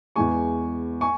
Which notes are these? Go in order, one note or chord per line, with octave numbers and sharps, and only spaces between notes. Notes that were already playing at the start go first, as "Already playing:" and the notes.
E2 E3 G#3 G#5 C#6
G#5 C#6